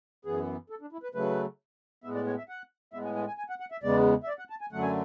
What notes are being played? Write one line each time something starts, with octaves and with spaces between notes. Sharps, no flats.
F#2 E3 B3 G#4
A4
D4
E4
B4
C#3 F#3 A3 B4
A2 G#3 B3 E5
D5
C#5
E5
F#5
A2 G#3 B3 E5
G#5
G#5
G#5
G#5
F#5
F#5
E5
E2 C#3 G#3 B3 D5
E5
D5
F#5
A5
G#5
F#2 D3 F#3 A3 F#5
G#5